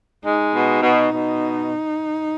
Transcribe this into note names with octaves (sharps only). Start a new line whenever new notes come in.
G#3 D#4
B2
B2
B2